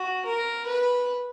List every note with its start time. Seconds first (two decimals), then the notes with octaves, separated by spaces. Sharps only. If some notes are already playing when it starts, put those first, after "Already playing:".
Already playing: F#4
0.25 A#4
0.66 B4